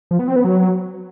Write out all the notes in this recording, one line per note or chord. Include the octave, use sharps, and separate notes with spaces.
F3
B3
C4
B3
F#3